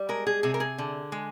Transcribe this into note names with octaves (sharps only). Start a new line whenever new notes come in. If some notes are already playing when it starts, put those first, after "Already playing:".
Already playing: G3
G#3 A#4
G#4
C3 G#4
A#4
G#4
D3
G#3